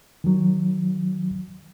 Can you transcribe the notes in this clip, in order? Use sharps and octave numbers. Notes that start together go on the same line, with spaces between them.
D#3 F#3